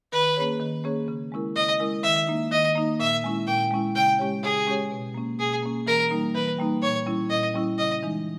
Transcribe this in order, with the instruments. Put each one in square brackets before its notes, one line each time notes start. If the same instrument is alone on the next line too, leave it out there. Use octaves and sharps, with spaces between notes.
[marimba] D#3 [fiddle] B4
[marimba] A#3 C#4 G#4 C#5
D#3
A#3 C#4 G#4 C#5
C#3
G#3 C#4 E4 A#4
[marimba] C#3 [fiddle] D#5
[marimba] G#3 C#4 E4 A#4
[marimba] D#3 [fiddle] E5
[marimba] A#3 D#4
[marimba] D#3 [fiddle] D#5
[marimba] A#3 D#4
[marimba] A#2 [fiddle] E5
[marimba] G#3 C#4 E4
[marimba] A#2 [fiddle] G5
[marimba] G#3 C#4 E4
[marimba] C#3 [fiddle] G5
[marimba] G#3 C#4 G4 C#5
[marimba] C#3 [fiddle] G#4
[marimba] G#3 C#4 G4 C#5
B2
A#3 C#4
[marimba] B2 [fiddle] G#4
[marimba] A#3 C#4
[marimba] E3 [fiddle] A#4
[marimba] G3 A#3 D#4
[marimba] E3 [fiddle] B4
[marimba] G3 A#3 D#4
[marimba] A#2 [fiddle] C#5
[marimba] G3 C#4 E4
[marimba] A#2 [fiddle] D#5
[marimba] G3 C#4 E4
[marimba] C#3 [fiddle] D#5
[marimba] E3 G#3 D#4